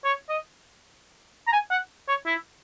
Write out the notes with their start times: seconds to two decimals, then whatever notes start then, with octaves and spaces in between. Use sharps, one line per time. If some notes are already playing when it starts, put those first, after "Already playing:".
0.05 C#5
0.29 D#5
1.47 A#5
1.53 G#5
1.71 F#5
2.09 C#5
2.26 E4